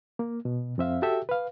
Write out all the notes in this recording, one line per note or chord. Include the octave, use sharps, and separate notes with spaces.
A#3
B2
F2 C4 E5 F5
F#4 G4 A4 E5 G5
B4 F5